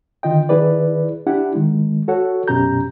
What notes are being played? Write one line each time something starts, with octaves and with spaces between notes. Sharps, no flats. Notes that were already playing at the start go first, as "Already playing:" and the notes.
D3 D#3 F4 D#5 G5
D#3 E4 G#4 B4 D5
D4 E4 G4 F#5
D#3 G#3
F#4 A4 C#5 F#5
F#2 B2 C#4 G4 A#5 G6